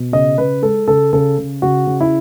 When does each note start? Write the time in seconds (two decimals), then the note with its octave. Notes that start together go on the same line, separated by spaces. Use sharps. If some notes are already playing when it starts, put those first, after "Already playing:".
Already playing: B2
0.13 C#3 D#5
0.38 C#3 B4
0.62 G#3 A4
0.87 C#3 A4
1.13 C#3 A4
1.38 C#3
1.62 C#3 F#4
1.87 C#3
2.01 E4